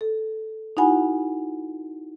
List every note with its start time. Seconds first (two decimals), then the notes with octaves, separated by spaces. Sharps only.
0.01 A4
0.77 D#4 E4 F#4 F#5 G#5 B5